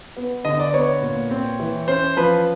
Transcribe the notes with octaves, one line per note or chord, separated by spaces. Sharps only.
B3
D3 D#5
D5
B3 C#5
A#2
C4
E3
C#4 C5
F3 B4